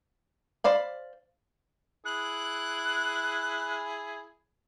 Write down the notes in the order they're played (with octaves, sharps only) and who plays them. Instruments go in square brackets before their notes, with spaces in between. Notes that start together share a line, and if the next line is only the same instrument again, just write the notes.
[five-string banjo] C5 D5 F5 B5
[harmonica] E4 G#4 [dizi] F#6